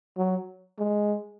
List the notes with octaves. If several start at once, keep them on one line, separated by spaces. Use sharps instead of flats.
F#3
G#3